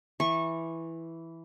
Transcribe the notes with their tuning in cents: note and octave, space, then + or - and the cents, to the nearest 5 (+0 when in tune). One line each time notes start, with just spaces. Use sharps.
E3 +0 C#6 -20